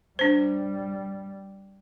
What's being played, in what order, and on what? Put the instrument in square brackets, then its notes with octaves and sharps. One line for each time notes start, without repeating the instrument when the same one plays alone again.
[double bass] G3 [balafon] D4 C5